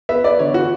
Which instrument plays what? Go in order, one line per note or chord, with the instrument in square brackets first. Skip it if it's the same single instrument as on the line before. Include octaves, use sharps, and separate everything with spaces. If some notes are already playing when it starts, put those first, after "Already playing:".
[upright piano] B3 E5
B3 D5
D3 C#5
E3 F#4